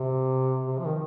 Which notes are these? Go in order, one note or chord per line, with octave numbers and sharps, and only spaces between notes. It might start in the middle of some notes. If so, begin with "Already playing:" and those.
Already playing: C3
C3
F3
D#3